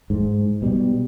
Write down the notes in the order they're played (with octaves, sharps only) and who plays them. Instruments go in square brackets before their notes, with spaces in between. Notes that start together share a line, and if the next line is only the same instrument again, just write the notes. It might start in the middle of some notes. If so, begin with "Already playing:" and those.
[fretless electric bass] G#2
B2 G3